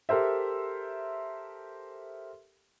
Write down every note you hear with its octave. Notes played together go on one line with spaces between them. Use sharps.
G4 A4 A#4 C5 E5